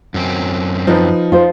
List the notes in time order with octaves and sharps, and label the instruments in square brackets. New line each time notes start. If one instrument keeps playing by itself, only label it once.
[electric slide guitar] F#2 C4
[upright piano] F3 D#4 B4
[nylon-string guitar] F4 C5